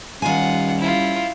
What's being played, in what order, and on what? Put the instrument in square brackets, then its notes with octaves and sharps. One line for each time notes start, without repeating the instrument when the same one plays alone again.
[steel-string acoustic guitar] D#3 G#5 [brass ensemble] G3 C#4 [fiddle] F4 F#5
[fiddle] E4 F4